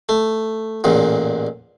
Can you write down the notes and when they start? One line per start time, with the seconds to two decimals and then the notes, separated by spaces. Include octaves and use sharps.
0.09 A3
0.84 A1 E2 A#2